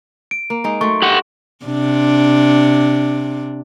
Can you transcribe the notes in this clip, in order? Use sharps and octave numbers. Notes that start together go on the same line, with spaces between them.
D7
A#3
G#3 D#4
F#3 A3 C6 C#6
G4 F#5
C3 D4